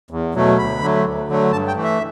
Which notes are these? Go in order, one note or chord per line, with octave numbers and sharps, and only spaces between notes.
E2
B2 F#3 A3
D2 B5
D3 F#3 A3
D2
D3 F#3 A3
G2 A5
G5
E3 A3
E5